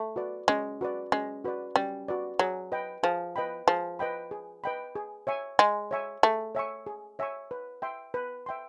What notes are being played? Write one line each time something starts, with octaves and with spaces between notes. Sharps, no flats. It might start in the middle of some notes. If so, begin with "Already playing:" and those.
Already playing: A3
F#4 B4 D5
G#3 C#4
F#4 B4 D5
G#3 C#4
F#4 B4 D5
G3 C#4
F#4 B4 D5
F#3 G#4
B4 D#5 G5 B5
F3 G#4
B4 D#5 G5 B5
F3 G#4
B4 D#5 G5 B5
G#4
B4 D#5 G5 B5
G#4
C#5 E5 G#5 C#6
G#3 G#4
C#5 E5 G#5 C#6
A3 G#4
C#5 E5 G#5 C#6
G#4
C#5 E5 G#5 C#6
B4
E5 G5 C6
B4
E5 G5 C6